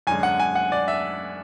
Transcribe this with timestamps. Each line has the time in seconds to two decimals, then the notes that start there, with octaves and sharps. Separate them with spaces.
0.07 F#2 D3 G#3 G#5
0.23 F#5
0.39 G#5
0.55 F#5
0.72 D5
0.88 E5